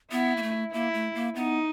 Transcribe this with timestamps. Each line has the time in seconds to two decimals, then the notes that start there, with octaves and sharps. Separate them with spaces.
0.11 B3 E4
0.37 A#3
0.43 A3
0.73 A#3 E4
0.94 A3
1.15 A#3
1.36 B3 D#4